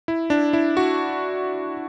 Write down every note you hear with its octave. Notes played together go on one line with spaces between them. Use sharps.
E4
D4
E4
F#4